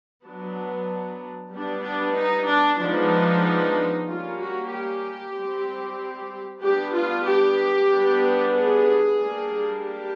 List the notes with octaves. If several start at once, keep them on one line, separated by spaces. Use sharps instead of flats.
F#3 B3 D4
G3 B3 D4
D4
D#4
D4
F3 G#3 B3 D4 D#4
G3 A#3 C#4 F4
F#4
G4
G3 C4
G3 B3 D4 G4
F4
G4
G3 B3 D4
G#4
G3 A#3 D4
G4